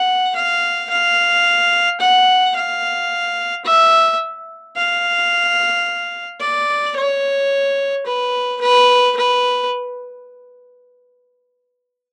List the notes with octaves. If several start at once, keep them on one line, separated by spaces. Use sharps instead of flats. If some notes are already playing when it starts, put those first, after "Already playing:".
Already playing: F#5
F5
F5
F#5
F5
E5
F5
D5
C#5
B4
B4
B4